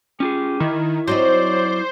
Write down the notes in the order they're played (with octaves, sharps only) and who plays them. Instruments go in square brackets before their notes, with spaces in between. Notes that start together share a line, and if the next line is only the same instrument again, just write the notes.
[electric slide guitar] C#4 F4 G#4 [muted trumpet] G4
[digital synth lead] D#3 [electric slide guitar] E4
[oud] F#3 C4 D#4 [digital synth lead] C5 [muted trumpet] D5